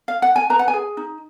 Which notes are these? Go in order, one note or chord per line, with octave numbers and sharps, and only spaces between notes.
F5
F#5
G#5
B4 A#5
F#5
G#5
G#4
D#4